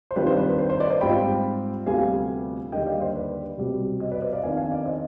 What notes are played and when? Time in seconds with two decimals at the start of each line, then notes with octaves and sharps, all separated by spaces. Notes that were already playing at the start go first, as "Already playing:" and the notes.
0.11 C5
0.16 F2 D#3 G3 D4 F4 B4
0.27 C5
0.37 B4
0.49 B4
0.58 C5
0.70 C5
0.80 B4 D5
0.90 C5 D#5
1.01 G#2 G3 C4 F4 G5 B5
1.86 D2 C3 G3 B3 F4 F5 G#5
2.72 D#2 D3 G3 D#5 G5
2.86 D5 F5
3.00 C5 D#5
3.15 B4 D5
3.57 C2 B2 G3 C4
4.00 C5 D#5
4.11 B4 D5
4.22 C5 D#5
4.32 D5 F5
4.43 F2 D#3 B3 D4 F5 G#5
4.57 F5 G#5
4.72 D5 F5
4.86 C5 D#5